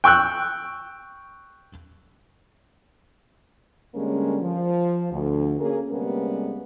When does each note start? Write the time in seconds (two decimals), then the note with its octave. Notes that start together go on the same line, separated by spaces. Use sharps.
0.04 G5 C#6 E6 F#6
3.95 D3 G3 G#3 A#3 C#4
4.41 F3
5.12 D2
5.60 A#3 C#4 G#4 A#4
5.90 C3 G3 G#3 A#3 B3 C#4